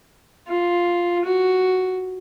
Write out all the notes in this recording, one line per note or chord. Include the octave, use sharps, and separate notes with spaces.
F4
F#4